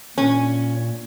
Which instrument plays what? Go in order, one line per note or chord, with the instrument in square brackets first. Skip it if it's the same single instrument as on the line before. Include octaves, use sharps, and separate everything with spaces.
[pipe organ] A#2 [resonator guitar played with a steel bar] C#4